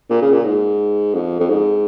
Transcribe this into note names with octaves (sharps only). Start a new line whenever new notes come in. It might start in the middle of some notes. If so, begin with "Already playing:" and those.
A#2
C#3
A#2
G#2
F2
F2
G#2